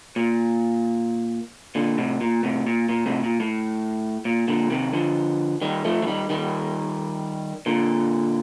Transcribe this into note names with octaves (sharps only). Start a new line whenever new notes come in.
A#2
A#2 D3
A2 C3
A#2
A2 C3
A#2
A#2
A2 C3
A#2
A2
A#2
A#2 D3
C3 D#3
D3 F3
D#3 G3
F3 A3
F3
D#3 G3
D#3 G3
A#2 D3